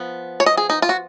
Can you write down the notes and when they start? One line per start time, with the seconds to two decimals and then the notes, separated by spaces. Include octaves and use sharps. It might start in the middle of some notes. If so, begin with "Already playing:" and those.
Already playing: F3 B3
0.40 C#5
0.46 D#5
0.57 G#4
0.70 D#4
0.82 F4
0.89 F#4